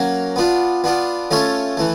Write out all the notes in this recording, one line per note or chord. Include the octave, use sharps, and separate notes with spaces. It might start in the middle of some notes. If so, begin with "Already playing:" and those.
Already playing: F#3 A#3 C#4
B3 D4 F4
B3 D4 F4
A3 C#4 F4 A4 C#5
E3 A3